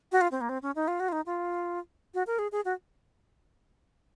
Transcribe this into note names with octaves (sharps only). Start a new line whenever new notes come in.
F#4
F4
C4
A#3
C4
C#4
D#4
F4
F#4
F4
D#4
F4
F#4
A#4
G#4
G#4
F#4